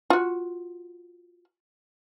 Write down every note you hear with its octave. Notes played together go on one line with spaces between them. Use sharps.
F4 F#4